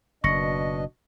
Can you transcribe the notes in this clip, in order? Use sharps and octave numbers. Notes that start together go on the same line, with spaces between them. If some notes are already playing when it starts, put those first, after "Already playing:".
F#1 B2 D4 D#5 C#6 A#6 C#7